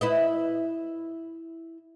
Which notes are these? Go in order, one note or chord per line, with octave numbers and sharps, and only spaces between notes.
E4 B4 D#5